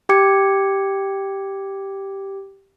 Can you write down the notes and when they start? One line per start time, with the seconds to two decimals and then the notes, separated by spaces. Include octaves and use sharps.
0.09 G4 G5 D6 G#6 C#7